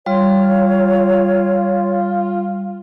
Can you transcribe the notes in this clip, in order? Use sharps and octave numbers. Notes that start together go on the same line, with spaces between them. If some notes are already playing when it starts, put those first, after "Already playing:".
G3 F4 C#5